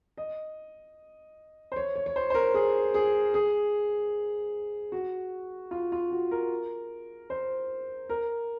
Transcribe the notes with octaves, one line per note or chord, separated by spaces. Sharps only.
D#5
C5
C#5
C#5
C#5
C5
C5
A#4
G#4
G#4
G#4
F#4
F4
F4
F#4
A#4
C5
A#4